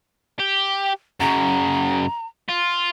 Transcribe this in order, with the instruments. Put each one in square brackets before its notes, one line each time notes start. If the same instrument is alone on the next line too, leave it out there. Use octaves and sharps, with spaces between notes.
[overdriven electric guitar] G4
[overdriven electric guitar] F#2 C#3 [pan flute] A#5
[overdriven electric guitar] F4